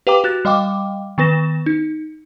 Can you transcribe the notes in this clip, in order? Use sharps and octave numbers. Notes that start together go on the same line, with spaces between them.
G4 B4 F5 G5 A#5 D6
F#4 F#6 A6
G3 D#5 F5 G5 D6
D#3 B3 B4 A#6 E7
D#4